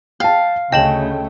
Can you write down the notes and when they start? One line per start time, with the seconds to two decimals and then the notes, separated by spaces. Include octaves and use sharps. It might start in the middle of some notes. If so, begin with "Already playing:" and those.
0.20 F5 G5 A5
0.72 D2 C#3 A3 D#5 G5 A5 F#7